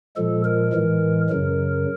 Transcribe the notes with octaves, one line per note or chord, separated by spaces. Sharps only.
A#2 F3 G#3 A4
A#4
A2 E3 G#3
F#2 C#3 F#3 A#4